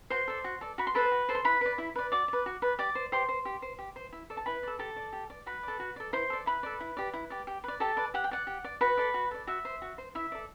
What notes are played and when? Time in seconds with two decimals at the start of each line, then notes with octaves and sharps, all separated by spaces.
0.10 F#4 C5 C6
0.28 A4 D5
0.44 F#4
0.61 A4 D5
0.78 F#4 B5
0.87 C6
0.95 A4 B4 C5 B5
1.12 F#4
1.29 A4 C5
1.35 C6
1.44 E4 B4 B5
1.61 B4 D5
1.78 E4
1.96 B4 D5
2.12 F#4 D5 D6
2.28 B4 D5
2.46 F#4
2.62 B4 D5
2.79 G4 D5 D6
2.95 C5
3.12 G4 C5 C6
3.29 C5
3.45 G4
3.62 C5
3.79 G4
3.96 C5
4.13 E4
4.30 A4 D5
4.37 A5
4.46 E4 B4 B5
4.63 A4 D5
4.79 G4 A4 A5
4.96 D5
5.13 G4
5.30 D5
5.46 F#4 B4 B5
5.63 A4 D5
5.80 F#4
5.96 A4 D5
6.13 E4 C5 C6
6.30 A4 D5
6.46 E4 B4 B5
6.63 A4 D5
6.80 E4
6.97 G4 D5
7.14 E4
7.30 G4 D5
7.47 G4
7.64 B4 D5
7.80 G4 A4 A5
7.97 B4 D5
8.14 G4 F#5
8.24 G5
8.31 D5 F#5
8.47 G4
8.64 D5
8.81 F#4 B4 B5
8.97 A4 D5
9.14 F#4
9.31 A4 D5
9.47 F#4 E5
9.65 C5
9.82 F#4
9.98 C5
10.15 E4 E5
10.32 A4 D5